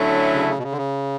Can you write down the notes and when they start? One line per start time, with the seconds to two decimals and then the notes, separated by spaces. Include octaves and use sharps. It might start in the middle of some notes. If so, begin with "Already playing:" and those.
Already playing: D3 F#3 A3 C#4 E4
0.34 C#3
0.48 C#3
0.58 B2
0.63 C#3
0.72 D3
0.78 C#3